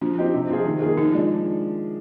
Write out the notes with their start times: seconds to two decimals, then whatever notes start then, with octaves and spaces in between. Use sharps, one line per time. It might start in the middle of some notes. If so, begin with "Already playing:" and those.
0.01 F3 D4
0.18 C4 D#4 G4
0.34 C3
0.49 F3 C4 F4 G#4
0.65 D#3
0.82 A#3 F4 G#4
0.97 F3 D#4
1.14 G#3 D4